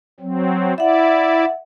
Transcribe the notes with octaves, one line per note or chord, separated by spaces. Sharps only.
F#3 C4
E4 D5 E5 F#5